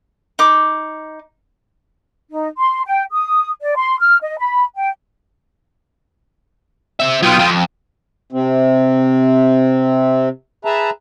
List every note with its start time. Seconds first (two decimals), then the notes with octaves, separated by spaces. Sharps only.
0.39 D#4 D6
2.31 D#4
2.58 C6
2.86 G5
3.12 D#6
3.61 D5
3.76 C6
4.01 F6
4.22 D#5
4.39 B5
4.76 G5
7.00 C4 E5
7.23 F#3 B3 F4 G5 D#6
7.39 F2
8.32 C3 C4
10.65 G#4 B4 E5 A5 A#5